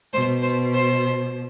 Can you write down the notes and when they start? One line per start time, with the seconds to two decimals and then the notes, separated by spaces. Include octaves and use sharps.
0.13 B2 C5
0.42 C5
0.73 C5